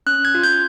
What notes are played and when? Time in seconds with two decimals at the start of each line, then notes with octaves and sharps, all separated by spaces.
0.07 C#4 F#6
0.25 G#6
0.35 F4
0.43 G6